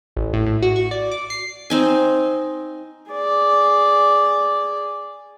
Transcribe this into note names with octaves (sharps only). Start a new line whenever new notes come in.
A1
A2
A2
F#4
C#6
D5
D6
C7
C4 D#4 G#5
G#4 D5